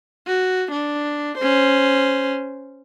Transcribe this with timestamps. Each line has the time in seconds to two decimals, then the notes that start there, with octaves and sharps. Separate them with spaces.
0.27 F#4
0.71 D4
1.37 C#4 C5